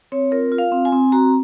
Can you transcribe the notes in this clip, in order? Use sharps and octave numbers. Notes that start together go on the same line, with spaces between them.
C4 C#5
F4 A#4
F4
F5
C4
G#5
C4
F#4 A#5